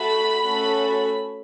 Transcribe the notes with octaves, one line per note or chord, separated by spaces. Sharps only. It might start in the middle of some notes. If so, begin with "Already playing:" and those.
Already playing: A3 F#4 A4 B5
A3 C#4 F#4 A4